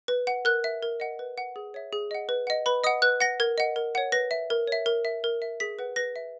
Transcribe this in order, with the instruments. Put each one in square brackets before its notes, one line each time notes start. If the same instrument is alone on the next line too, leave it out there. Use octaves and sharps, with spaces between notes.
[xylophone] B4
F#5
A#4 F#6
E5
A#4
D#5 F#5
B4
F#5
G#4
C#5 E5
G#4
D#5 F#5
B4
D#5 F#5
B4 B5
D#5 F#5 D#6
B4 F#6
F#5 A#6
A#4 G#6
D#5 F#5
A#4
C#5 F#5
B4 A#6
E5
A#4
C#5 E5
A#4
E5
A#4
E5
G#4 B6
B4 F#5
B4 A#6
E5